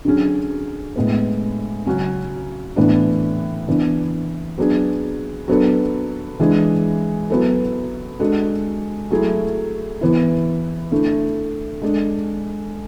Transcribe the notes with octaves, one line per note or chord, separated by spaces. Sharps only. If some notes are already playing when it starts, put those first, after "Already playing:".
D3 F#3 C#4 G#4
A2 G#3 B3
C#3 F#3 C#4 F#4
A2 E3 B3 D4
E3 B3 D4
F#3 B3 D4 G#4
F#3 B3 D4 A4
E3 G#3 D4 G#4
F#3 B3 E4 A4
G#3 D4 F#4 A4
F#3 A3 E4 G#4
E3 B3 E4
D3 A3 E4
G#3 D4 A4